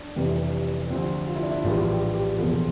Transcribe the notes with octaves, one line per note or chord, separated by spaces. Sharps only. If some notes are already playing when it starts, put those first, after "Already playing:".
Already playing: D4
F1 F2 E3 G3
D2 C3 F3 C4
F4
E4
D4
E4
A#1 A2 E3 G3 F4
G4
G4
E1 E2 C3 F3 A4